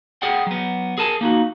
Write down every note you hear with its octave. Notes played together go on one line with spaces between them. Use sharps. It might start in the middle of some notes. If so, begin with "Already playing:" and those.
G#4 D5 F#5 G5
F#3 B3
G#4 A#4 G#5 A5
A#3 D#4 F#4